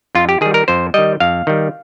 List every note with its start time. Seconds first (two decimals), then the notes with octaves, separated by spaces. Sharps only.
0.15 F2 F4
0.29 G4
0.41 D#3 G3 G#4
0.54 A#4
0.68 F2 C5
0.94 D#3 G3 D#5
1.20 F2 F5
1.47 D#3 G3